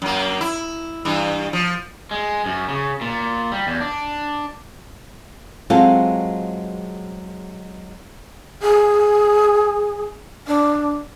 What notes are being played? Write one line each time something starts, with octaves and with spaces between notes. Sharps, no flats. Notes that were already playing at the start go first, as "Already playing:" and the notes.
F#2 A#3
E4
G2 E3
F3
G#3
F#2
C#3
A#2
G3
E2
D4
F#3 G#3 C4 F4 G#4 A4
G#4
D4